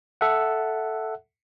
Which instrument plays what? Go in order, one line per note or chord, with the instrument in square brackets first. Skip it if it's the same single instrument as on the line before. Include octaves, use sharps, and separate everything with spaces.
[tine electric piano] A4 E5 F#5